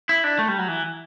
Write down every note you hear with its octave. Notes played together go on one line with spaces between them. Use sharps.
E4
D4
A3
G3
F#3
E3